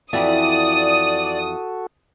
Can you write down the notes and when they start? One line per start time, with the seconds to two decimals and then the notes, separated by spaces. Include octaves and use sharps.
0.13 F2 E3 F#4 A4 D5 E5 D#6